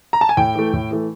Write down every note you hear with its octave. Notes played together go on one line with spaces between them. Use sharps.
A#5
A5
G#5
A2 G5
E3 A3
A2
E3 A3